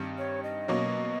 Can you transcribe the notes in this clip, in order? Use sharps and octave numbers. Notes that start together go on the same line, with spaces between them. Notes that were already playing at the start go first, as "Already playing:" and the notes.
Already playing: G2 D#3 G3 C4 D#4
C#5
D#5
B2 F#3 A#3 C#4